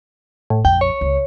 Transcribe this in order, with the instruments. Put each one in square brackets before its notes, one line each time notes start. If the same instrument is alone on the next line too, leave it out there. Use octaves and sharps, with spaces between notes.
[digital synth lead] A2
[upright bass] A#1 F2 [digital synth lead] G5
[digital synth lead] C#5
[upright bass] C#2